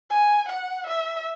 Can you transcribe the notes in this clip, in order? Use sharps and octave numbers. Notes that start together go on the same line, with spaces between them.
G#5
F#5
E5